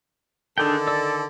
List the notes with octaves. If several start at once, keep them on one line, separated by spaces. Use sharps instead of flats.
D3 D#3 D4 G#4 A4 G5
D5 E6